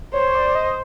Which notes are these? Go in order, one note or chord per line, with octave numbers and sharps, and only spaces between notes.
C5 C#5
D5
D#5